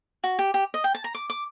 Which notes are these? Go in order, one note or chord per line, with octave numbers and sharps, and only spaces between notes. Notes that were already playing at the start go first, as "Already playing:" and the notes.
F#4
G4
G4
D#5
G5
A5
A#5
D6
D6